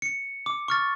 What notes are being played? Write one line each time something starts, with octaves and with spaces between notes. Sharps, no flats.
C#7
D6
C#6 F6 A6